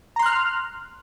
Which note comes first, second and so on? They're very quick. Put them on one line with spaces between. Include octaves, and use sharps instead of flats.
A#5 C6 F#6 F6